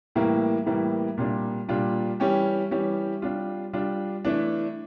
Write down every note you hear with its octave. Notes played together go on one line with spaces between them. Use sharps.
A2 E3 G3 A#3 E4
A2 E3 G3 A#3 E4
A#2 G3 D4 F4
A#2 G3 D4 F4
E3 G3 C#4 G4
E3 G3 C#4 G4
G3 D4 F4
G3 D4 F4
E3 A3 D4